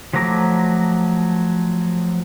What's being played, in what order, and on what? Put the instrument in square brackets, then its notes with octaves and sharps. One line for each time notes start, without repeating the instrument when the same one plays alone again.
[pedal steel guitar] F3 F#3 A3 A#5 D6